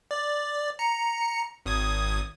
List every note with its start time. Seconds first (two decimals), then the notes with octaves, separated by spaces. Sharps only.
0.11 D5
0.79 A#5 C#7
1.66 G#1 D#6 G#6